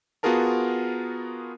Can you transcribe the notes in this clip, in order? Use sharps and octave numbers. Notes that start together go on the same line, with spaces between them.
B3 F4 F#4 G#4 A#4 A5